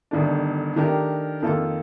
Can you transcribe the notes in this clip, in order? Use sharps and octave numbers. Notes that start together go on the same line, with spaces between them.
G1 G2 D#3 A3 D4
D#3 A3 D4 G4 A#4
F2 D#3 A#3 F4 A4